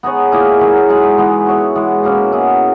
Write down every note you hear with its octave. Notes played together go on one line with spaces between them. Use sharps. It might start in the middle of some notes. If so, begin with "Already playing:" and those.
B3 D#4 G#4 C#5
A#2 A#3 E4 G#4
F#3 B3 F#4 A#4
B2 G#3 D#4 G#4
E3 G#3 B3 D#4
B3 F#4 C#5 E5
E3 G#3 B3
B2 A#3 C#4 E4
B3 E4 G#4 D#5